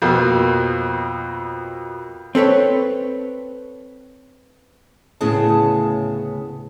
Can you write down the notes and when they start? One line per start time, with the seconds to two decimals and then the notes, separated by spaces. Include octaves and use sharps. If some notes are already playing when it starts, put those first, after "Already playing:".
0.02 F2 B2 A#3
2.35 C4 A4 B4 C#5
5.21 D2 A2 C#3 B3 G#4 A5